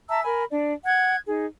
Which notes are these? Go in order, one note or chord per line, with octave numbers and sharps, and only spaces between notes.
E5 A5 A#5 E6
A#4 G#5 B5
D4 D5
F#5 F#6 G#6
D#4 G#4